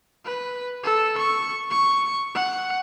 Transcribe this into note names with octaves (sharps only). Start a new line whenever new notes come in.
B4
A4
C#6
C#6
F#5